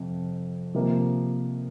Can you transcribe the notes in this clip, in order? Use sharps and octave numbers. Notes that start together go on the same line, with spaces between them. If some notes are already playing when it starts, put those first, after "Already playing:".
Already playing: F2 C3
C3 F3 A#3